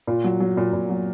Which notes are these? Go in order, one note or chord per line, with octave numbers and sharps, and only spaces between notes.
A#2 F4
F#3
F#3
A#2
A#2
F#3